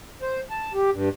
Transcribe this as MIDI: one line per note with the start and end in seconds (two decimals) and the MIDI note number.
0.22 0.41 72
0.51 0.73 81
0.74 0.90 67
0.92 1.09 43